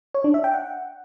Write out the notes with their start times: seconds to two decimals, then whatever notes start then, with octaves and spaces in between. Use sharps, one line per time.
0.14 C#5
0.24 D4
0.34 E5
0.44 G5
0.54 F#5